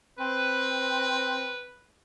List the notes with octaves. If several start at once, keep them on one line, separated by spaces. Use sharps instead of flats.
C4 B4